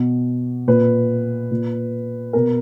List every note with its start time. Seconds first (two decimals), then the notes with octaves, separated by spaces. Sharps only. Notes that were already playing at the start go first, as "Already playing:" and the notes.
Already playing: B2
0.67 A#2 B4
1.51 A#2
2.33 B2 A#4